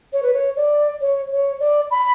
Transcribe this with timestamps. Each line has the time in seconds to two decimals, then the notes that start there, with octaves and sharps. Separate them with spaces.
0.13 C#5
0.23 B4
0.33 C#5
0.57 D5
1.01 C#5
1.31 C#5
1.60 D5
1.91 B5